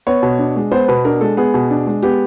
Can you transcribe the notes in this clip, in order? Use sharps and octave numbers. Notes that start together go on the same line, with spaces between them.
B3 C#5
B2
D4
G#3
B3 C5
B2 B4
D4 A#4
G#3 A4
B3 G#4
B2
D4
G#3
B3 G4